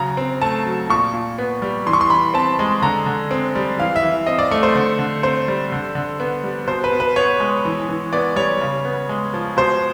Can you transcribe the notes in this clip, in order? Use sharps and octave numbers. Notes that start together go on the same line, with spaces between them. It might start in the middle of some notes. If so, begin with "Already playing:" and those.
Already playing: C#3 F#3 A#5
C4
A3 A5
F#3
A#2 C#6
A#2
B3
G3
E3 C6
C#6
C6
E3 B5
C4 A5
G#3
D3 A#5
D3
C4
G3
E3 F5
E5
E3
C4 D#5
D5
A3
C5
D3
D3
C4 C5
G3
D3
D3
B3
G3
B2 C5
B4
B2
B4
B3 C#5
G#3
E3
E3
B3 D5
G3 C#5
C#3
B3
G#3
F3
B2 C5